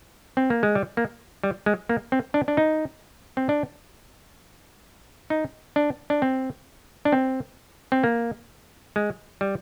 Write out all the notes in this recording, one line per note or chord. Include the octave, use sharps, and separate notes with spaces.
C4
A#3
G#3
G3
A#3
G3
G#3
A#3
C4
D4
D4
D#4
C4
D4
D#4
D4
D4
C4
D4
C4
C4
A#3
G#3
G3